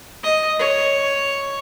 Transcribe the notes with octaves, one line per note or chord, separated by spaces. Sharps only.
D#5
C#5